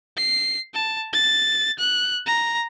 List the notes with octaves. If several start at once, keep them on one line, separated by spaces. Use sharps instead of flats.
C7
A5
A6
F#6
A#5